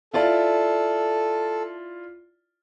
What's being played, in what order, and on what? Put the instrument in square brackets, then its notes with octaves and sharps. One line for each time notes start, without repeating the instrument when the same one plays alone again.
[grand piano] E4 F4 D5 [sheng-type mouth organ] A4